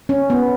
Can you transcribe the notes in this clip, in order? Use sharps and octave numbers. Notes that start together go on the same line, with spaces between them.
C#4
B3